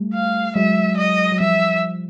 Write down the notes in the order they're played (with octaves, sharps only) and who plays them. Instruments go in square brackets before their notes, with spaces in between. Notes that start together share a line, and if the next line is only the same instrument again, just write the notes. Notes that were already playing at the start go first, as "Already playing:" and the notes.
Already playing: [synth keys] G3 A3
[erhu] F5
[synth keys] F#3 G#3 [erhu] E5
[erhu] D#5
[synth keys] F#3
[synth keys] F3 G3 [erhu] E5